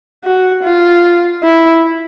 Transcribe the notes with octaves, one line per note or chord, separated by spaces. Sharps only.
F#4
F4
E4